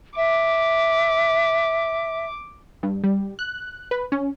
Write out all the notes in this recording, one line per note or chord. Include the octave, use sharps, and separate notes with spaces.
E5 D6
G2
G3
F#6
B4
C#4